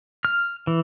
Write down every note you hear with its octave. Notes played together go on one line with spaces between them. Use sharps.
F6
E3